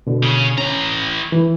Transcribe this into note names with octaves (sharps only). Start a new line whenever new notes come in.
B2 D3
C#3 C#4
E3 C#4 A#5
E3